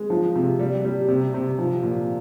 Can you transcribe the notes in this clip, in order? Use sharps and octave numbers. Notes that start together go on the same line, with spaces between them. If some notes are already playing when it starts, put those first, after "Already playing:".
Already playing: G#3
F3
C3
G3
G3
C3
C3
F3
A#2